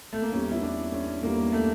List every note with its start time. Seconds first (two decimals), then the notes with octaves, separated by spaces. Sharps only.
0.13 A3
0.22 A#3
0.32 E2 E3 G3 C#4
0.52 E4
0.62 D4
0.92 C#4
1.22 E2 E3 G3 A#3
1.52 A3